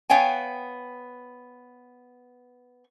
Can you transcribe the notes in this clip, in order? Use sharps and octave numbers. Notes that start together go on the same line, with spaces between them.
B3 C#5 F5 G5 G#5